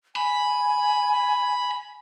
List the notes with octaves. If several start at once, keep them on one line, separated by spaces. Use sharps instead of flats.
G#5 B5